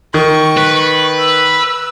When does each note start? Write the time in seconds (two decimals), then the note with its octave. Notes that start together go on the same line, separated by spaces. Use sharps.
0.14 D#3 C#6
0.58 B4
1.19 E6